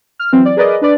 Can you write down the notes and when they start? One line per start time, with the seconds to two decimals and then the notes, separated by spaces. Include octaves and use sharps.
0.19 F6
0.32 E3 F#3 C4
0.45 D5
0.57 G#4 A#4 B4 D5 D#5
0.82 D4 B4 D5